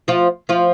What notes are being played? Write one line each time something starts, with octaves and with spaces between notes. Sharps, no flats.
F3 F4
F3 F4